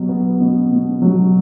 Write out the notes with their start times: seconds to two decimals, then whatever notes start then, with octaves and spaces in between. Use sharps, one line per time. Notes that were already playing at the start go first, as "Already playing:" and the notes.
Already playing: B2 F#3
0.09 B3
0.41 B2
0.71 B2
1.02 F#3